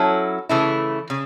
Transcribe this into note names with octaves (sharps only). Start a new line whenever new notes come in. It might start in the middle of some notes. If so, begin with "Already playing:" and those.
Already playing: F#3 C#4 E4 A4
C#3 E3 A3 E4
C#3